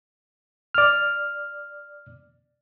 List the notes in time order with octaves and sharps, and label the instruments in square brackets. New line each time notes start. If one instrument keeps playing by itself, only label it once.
[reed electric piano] D5 F6